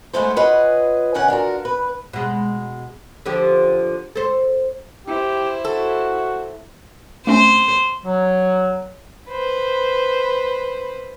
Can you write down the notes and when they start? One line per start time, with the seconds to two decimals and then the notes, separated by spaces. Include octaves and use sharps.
0.13 G#3 A3 B3 E4 A4 C5
0.36 F4 G#4 B4 C#5 D#5 F#5
1.14 G#2 C#3 C#4 F#5
1.28 D4 F4 F#4 A#4
1.65 B4
2.13 B2 G#3
3.26 D3 F3 G4
4.16 A4 C5
5.07 E4 G4 C5
5.65 F#4 A4
7.27 A3 C4 C#4 C5
8.03 F#3
9.29 B4 C5